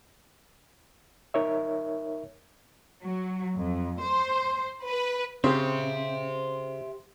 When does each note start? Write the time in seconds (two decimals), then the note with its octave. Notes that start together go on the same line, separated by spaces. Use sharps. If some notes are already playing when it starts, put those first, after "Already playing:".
1.34 D#4 A#4 C#5 E5
3.04 F#3
3.57 F2
4.02 C5
4.86 B4
5.44 C#3 C4 G4 C5 E5 C6